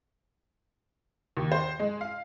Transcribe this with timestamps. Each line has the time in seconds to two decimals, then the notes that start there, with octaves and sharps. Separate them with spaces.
1.37 D#2
1.52 C5
1.79 G#3
2.01 F5